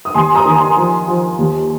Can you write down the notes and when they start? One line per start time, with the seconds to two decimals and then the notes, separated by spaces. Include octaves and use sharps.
0.05 D#6
0.14 D#2 G#5 C6
0.35 A#5 D#6
0.45 D#3
0.55 G#5 C6
0.76 F3
1.08 F3
1.38 D#2